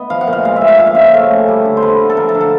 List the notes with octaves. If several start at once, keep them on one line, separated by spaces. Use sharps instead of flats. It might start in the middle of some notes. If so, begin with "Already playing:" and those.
Already playing: B3 D#5
F3 F5
F#5
A#2
F5
G#3 F5
E5
A#2
F5
F3 F5
E5
C#3 F5
A3 E5
C#4
G3
D3
C5
B3 B4
D3
A4
F3 A#4
A4
D3
A4